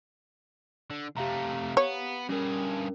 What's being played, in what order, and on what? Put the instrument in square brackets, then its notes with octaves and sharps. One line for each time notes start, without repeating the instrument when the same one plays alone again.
[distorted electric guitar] D3
[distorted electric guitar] C3 A3 [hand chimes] G4 F5 A#5
[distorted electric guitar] B3 [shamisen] C#5
[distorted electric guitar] G2 G#4 [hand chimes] C#4 A#4